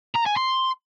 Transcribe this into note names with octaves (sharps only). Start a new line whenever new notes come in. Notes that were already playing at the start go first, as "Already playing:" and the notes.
A#5
G#5
C6